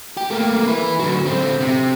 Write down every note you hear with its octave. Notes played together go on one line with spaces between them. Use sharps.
G4
A3 A#3
E4 B4
D3 F#3
D3 C4
C3